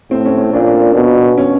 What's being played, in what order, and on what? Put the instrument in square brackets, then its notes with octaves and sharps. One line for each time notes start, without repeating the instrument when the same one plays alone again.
[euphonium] A2 [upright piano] C4
[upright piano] C#4
C#4
[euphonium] A#2 [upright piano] D4
[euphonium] B2
[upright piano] C#4